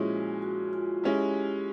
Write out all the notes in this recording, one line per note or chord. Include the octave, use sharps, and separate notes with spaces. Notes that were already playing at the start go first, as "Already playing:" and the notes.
Already playing: A#2 F3 G#3 C#4 E4 F#4
F#4
F4
G#3 C#4 E4 G4